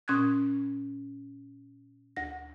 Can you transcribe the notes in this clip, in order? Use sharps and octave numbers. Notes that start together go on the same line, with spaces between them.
A#2 C#4 C6 D#6 F#6 G#6
D2 A#6